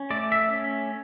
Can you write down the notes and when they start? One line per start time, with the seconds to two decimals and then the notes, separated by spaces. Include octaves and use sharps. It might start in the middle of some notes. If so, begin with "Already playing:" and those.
Already playing: C#4
0.10 A3 D5
0.32 E5
0.53 C#4